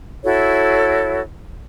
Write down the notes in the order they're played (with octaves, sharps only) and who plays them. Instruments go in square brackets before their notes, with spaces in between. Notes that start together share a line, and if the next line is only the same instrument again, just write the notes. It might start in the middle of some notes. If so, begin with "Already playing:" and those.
[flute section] E4 F#4 A4 C#5